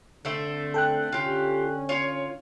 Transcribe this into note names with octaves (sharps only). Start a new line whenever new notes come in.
D3 A3 C4 E5
A4 G5 F#6
D3 C#4 F4 G4
F4 C#5